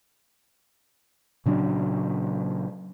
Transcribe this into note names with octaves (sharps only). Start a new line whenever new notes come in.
A#2 C#3 F#3 D4